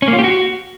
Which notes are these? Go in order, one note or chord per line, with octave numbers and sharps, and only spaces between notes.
C#4
A#3
F4
G4
F#4